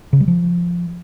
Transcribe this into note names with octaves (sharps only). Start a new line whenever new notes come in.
C#3
G3
F3